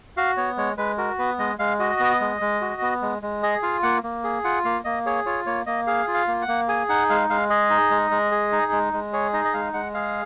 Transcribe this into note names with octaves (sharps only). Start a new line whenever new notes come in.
F#4 F5
B3 C#5
G#3 C#5
G#3 B4
F#4 A#4
B3 B4
G#3 D#5
G#3 F5
F#4 D#5
B3
G#3
G#3
F#4
B3
G#3
G#3
G#4 D#5
F4 F5
A#3 F#5
A#3
G#4
F4 F#5
A#3 F5
A#3 D#5
G#4 C#5
F4 C#5
A#3 C#5
A#3 D#5
G#4 F5
F4
F5
A#3
F#5
A#3
G#4 G#5
D#4 F#5
G#3 F5
G#3 F5
G#4 D#5
D#4
G#3
G#3
G#4
D#4
G#3
G#3
G#4 C#5
D#4 D#5
D#5
G#3 F5
G#3 F#5
G#4 F5